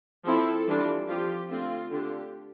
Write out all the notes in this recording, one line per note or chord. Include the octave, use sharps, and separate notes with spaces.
F3 C4 E4 A4
E3 G3 D4 F4
F3 C4 F4 G4
D3 A3 C4 F4
D3 A3 D4 F4 G4